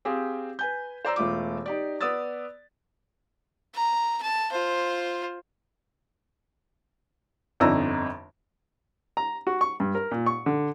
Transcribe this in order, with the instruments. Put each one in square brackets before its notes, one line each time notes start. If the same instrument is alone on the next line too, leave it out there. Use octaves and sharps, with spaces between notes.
[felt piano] C4 G4 G#4 F5
B4 G#5 G6
C5 D5 A#5 E6
E1 A3 F4 D6
D#4 G4 D5
B3 D5 D#6 E6 A6
[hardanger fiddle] A#5
A5
F4 C5
[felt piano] G1 F2 D4 D#4 A#5 E6
[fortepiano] A#5
F#4
C#6
G2
A#4
A#2
C#6
D3